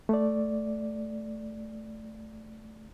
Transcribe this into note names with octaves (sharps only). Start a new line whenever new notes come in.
A3 D5